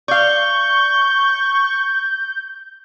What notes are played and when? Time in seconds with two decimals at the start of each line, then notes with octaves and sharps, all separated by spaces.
0.08 D5 F5 C#6 G6